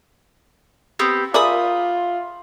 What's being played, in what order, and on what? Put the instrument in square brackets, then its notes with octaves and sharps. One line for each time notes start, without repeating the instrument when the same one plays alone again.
[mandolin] B3 C4 G4
[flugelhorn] F4 [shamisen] G#4 A#4 D5 [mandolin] E5 B5 D#6